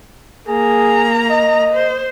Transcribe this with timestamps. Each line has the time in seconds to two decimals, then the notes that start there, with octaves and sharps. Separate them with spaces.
0.48 A#3 G#4 A#5
1.30 D#5
1.73 C5